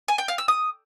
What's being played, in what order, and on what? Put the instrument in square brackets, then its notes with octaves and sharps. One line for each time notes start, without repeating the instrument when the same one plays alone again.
[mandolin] G#5
G5
F5
E6
D#6